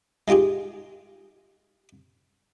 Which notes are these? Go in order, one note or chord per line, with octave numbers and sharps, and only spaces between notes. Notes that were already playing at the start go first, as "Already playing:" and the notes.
G#3 D#4 F4 G4 G#4